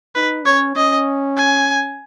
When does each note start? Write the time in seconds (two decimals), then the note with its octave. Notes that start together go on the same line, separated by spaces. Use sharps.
0.15 D#4 B4
0.45 C#4 C#5
0.76 C#4 D#5
1.37 G#5